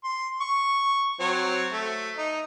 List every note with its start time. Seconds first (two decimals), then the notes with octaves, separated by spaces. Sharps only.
0.04 C6
0.41 C#6
1.20 F#3 C4 C#5
1.72 A3
2.17 D#4